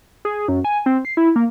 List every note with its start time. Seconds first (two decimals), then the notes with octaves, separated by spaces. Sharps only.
0.25 G#4
0.48 F#2
0.65 G#5
0.86 C4
1.05 C7
1.17 E4
1.36 A#3